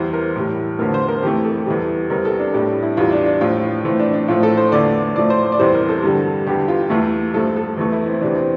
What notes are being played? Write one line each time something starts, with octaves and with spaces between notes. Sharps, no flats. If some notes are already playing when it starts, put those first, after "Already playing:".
Already playing: E2 E3 G3 C5
A#4
A2 E3 G3
E2 D3 F3 A3 A#4
C5
A#4
F2 E3 A3 G4
A4
E2 E3 G3
E2 C3 G3 A#4
A4
D4
A2 G3 D4
E4
E2 E3 G3 F4
D4
D4
A2 F3 A3 F4
A2 E3 A3 C4
D4
D4
A2 F3 A3 F4
A4
C5
E2 D3 A3 D5
A2 F3 A3 D5
C5
C5
D5
E2 C3 E3 G3 C5
A#4
A4
G2 D3 G3
E2 D3 G3 G4
F4
E2 E3 A3
G2 F3 A3 A4
A4
E2 E3 A3
E4
C4
E2 C3 E3 D4
C4